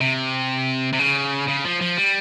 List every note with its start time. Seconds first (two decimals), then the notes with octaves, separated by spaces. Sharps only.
0.01 C3
0.93 C3
0.99 C#3
1.48 C#3
1.64 F3
1.81 F3
1.97 G3